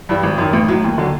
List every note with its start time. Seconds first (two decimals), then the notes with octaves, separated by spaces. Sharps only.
0.09 G2 E3 G3
0.23 G#1
0.38 F#2 D#3
0.53 A1
0.68 A2 F#3
0.84 D#2
0.98 D3 F#3